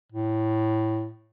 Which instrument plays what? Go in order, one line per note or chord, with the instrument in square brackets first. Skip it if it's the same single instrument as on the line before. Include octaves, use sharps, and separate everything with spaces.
[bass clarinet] A2